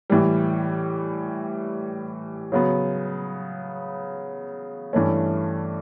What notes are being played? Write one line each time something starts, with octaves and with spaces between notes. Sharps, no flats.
A2 E3 G3
C#3 F#3 B3
G2 E3 A3 C#4